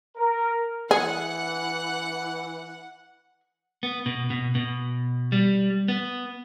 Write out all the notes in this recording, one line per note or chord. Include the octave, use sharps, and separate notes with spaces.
A#4
E3 G#4 F#5
B3
B2
B2
B2
G3
B3